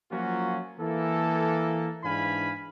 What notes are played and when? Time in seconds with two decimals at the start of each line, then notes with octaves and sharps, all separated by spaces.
0.11 F3 F#3 A#3 C#4 F4 F#4
0.79 E3 A#3 A4
2.04 G#2 E3 D4 F5 G#5 B5